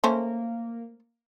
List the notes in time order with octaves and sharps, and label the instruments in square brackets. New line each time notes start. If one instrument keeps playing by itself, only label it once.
[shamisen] A3 C#4 C5 [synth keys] A#3